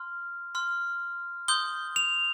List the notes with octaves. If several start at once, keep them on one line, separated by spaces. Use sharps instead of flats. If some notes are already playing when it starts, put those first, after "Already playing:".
Already playing: C6 F6
C6 F6
C6 D#6 G6 G7
F7